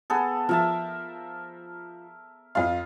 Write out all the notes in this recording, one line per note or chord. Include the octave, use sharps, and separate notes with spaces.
B3 G#4 A4
F3 A#4 E5 A5
F2 F4 F5